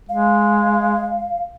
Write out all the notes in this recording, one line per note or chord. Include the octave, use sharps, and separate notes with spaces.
G#3 F5